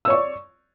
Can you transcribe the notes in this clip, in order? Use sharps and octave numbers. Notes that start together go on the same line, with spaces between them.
C#5 D5 C#6 E6